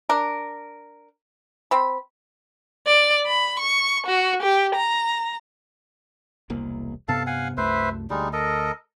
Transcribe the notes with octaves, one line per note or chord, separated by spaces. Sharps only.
D4 A#4
C4 B5
D5
B5
C#6
F#4
G4
A#5
E1 C2 A#3
G2 C3 B3 A4 F5 A5
F5 F#5 G#5
C2 F#2 A3 B4 C5 E5
D2 G3 G#3 D#4
A4 A#4 D#5